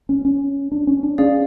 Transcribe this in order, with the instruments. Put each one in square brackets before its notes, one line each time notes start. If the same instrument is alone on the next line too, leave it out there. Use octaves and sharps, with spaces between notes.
[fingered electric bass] C#4
C#4
D4
C#4
D4
[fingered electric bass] C#4 [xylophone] G#4 D5 F5